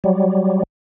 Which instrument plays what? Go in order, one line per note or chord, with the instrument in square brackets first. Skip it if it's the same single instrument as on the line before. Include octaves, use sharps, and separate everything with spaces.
[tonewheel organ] F#3 G3